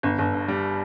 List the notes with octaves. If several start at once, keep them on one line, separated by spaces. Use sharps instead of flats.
G1
G1
G2
G3